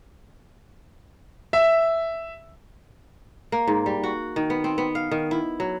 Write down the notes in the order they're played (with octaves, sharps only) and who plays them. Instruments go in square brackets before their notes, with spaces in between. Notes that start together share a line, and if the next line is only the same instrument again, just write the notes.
[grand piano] E5
[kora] A#3
G#2
G3
F#4
D#3
B3
C4
B3
F5
D#3
E4
F#3